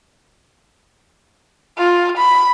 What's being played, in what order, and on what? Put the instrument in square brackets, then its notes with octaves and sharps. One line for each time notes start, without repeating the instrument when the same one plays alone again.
[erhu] F4
B5